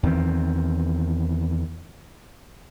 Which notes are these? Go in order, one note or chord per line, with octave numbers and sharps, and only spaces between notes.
E2 D#3 A3 C4